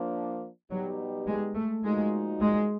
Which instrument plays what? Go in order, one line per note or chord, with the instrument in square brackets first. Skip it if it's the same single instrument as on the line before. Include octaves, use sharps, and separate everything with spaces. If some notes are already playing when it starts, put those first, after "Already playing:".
Already playing: [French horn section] F3 A#3 D4
[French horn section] B2 G3 B3 D#4 G4 [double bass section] F#3
[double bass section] G#3
A3
[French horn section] A#2 F3 A#3 D#4 F#4 [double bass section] G#3
[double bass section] G#3